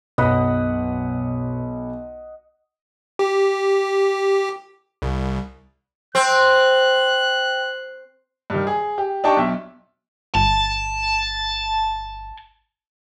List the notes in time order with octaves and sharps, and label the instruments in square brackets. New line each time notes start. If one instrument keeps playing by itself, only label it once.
[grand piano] B1 B5 [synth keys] F#2 B2 [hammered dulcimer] D#5 F#5
[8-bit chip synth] G4
C2
[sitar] C4 [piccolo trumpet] F#6
[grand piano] G2 D#3
G#4
G4
D4 D#4 G4 G5 A5 C#6
B1 E5
[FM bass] G1 [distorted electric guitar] A5